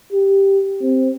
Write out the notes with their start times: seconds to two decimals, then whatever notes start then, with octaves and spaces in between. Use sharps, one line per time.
0.13 G4
0.82 C4